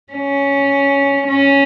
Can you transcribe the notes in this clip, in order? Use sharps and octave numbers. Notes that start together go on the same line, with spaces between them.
C#4
C#4